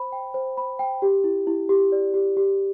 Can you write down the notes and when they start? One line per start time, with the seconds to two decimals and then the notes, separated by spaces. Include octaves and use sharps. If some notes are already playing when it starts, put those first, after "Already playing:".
Already playing: C5 B5
0.12 G5
0.34 C5
0.57 B5
0.79 G5
1.02 G4
1.24 E4
1.47 E4
1.69 G4
1.92 D5
2.14 G4
2.37 G4